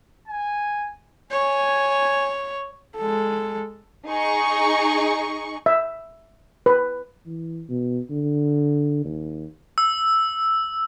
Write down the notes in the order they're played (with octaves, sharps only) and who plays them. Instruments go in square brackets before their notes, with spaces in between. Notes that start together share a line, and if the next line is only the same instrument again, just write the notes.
[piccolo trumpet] G#5
[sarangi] C#5 [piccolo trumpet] G#5
[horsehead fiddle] G#3 A4
[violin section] D#4 G#4 C#6
[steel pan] E5
B4
[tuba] E3
B2
D3
D#2
[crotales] E6